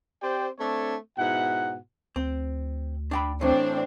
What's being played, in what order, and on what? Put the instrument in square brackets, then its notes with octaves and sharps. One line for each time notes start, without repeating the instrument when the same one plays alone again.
[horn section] C4 G4 C5 D5 G5
A3 C4 D4 A4 C#5
G#2 B2 E4 F#5
[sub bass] D2 [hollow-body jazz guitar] C4
[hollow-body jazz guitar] D4 G5 B5
[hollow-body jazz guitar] A2 E3 [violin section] C4 D4